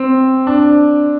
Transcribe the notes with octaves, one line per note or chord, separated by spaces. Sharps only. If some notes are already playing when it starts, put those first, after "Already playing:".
Already playing: C4
D4